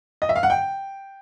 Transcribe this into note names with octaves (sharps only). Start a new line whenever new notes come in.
D#5
E5
F5
F#5
G5